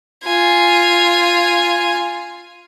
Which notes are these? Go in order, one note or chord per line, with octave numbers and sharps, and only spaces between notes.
F4 G#5